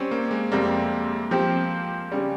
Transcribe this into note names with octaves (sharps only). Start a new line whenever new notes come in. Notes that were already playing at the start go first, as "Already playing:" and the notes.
Already playing: G3 C4 C#4 G4
A#3
G#3
F2 C3 G3 A#3
F3 C4 G4 C5
C#3 G3